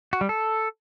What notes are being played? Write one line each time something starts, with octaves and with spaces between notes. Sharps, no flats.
F#4
G3
A4